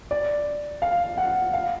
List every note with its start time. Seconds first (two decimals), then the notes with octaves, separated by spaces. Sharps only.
0.11 D5
0.82 F5
1.17 F#5
1.53 F5